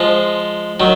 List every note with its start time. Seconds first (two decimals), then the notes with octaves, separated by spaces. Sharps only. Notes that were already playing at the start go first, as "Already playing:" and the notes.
Already playing: F3 G#3
0.80 D#3 F#3